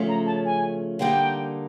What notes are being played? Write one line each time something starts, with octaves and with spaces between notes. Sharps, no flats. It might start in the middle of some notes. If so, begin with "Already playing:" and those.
Already playing: C#3 F3 A3 C#4
A#5
A5
G#5
D3 G3 A#3 D#4 G5